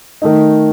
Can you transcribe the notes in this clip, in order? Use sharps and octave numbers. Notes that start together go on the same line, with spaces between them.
D#3 A3 D#4